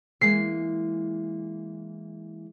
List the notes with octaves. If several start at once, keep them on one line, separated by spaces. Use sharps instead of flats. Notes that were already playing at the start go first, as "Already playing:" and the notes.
E3 G#3 A#3 C7